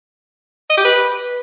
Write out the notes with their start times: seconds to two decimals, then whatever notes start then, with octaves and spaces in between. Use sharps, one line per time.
0.70 D#5
0.77 G4
0.85 B4